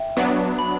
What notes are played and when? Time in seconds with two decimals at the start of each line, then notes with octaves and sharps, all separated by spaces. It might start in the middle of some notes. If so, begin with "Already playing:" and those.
Already playing: E5 G5
0.17 F#3 B3 D4
0.59 B5